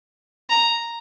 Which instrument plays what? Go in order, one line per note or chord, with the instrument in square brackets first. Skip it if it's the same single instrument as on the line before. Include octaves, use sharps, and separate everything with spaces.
[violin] A#5